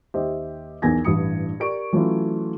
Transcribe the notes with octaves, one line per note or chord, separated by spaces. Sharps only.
D#2 G4 C5 D#5 E5
B1 E2 A#4 G#5 G#6 A#6
A1 G2 E3 D#6 C#7
G4 A#4 D5 C#6 D7
E3 F#3 A3 C#4 E4 F4